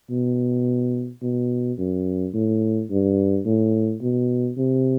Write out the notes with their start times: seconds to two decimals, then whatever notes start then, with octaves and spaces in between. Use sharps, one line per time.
0.10 B2
1.22 B2
1.78 F#2
2.34 A2
2.90 G2
3.46 A2
4.01 B2
4.58 C3